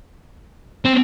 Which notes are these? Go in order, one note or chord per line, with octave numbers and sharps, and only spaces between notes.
C4